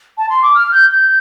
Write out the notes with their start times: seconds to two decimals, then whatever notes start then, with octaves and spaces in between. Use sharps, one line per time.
0.18 A5
0.30 C6
0.43 D6
0.55 F6
0.72 G6
0.90 G6